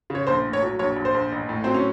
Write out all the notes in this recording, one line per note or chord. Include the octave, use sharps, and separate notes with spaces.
C#3 C#5
A#1 C5
A2
C#5
F#3
A#1 C#5
A#1
C5
A#1
A1
A2
F#3 C4
C#4